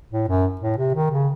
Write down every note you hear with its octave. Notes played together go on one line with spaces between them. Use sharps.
A2
F#2
A2
C3
D#3
C#3